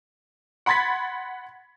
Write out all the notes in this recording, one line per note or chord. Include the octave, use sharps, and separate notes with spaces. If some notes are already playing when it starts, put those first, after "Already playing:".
F#5 B5 C6 G#6 A6 B6